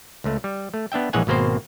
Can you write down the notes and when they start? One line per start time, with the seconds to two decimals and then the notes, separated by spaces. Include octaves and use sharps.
0.24 C#2 A3
0.44 G3
0.74 A3
0.92 B3 D4 E5 G5
1.13 A#1 E3 G#3 C#5 F#5 G#5
1.27 G#1 B2 A#3 C4 C5